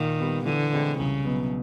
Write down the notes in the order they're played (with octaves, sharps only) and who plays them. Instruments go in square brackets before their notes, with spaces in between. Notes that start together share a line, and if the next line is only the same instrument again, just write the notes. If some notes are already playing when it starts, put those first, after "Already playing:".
Already playing: [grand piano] A#2 [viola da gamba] D#3
[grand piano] G3 B3
[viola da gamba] D3 [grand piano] E3
[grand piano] G#3 C4 E4
[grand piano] C2 [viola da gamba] C#3
[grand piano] B2 F#3 B3